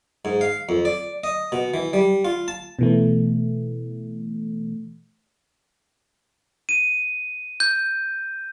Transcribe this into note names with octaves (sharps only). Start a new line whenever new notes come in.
G#2
F5
F2
D5
D#5
B2
E3
G3
F4
A5
B2 E3 A3
D#7
G6